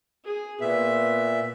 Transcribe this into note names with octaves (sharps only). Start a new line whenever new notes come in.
G#4
A#2 B3 E5